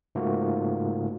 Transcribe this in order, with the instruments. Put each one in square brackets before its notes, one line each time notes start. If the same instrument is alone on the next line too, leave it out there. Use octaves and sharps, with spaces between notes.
[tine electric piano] G#2 C#3 A3 A#3 F4 F#4